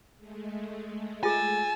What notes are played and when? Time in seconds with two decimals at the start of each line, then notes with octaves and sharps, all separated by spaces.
0.17 G#3 A3
1.23 F4 G#4 G#5 E6 A6